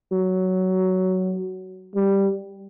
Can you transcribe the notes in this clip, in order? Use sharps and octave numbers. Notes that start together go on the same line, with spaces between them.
F#3
G3